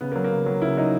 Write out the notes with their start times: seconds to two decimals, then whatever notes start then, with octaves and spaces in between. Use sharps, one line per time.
0.01 C#3 B3
0.12 A#3
0.16 F#3
0.24 A#3
0.32 C#3
0.46 F#3
0.62 C#3 E4
0.77 F#3 D#4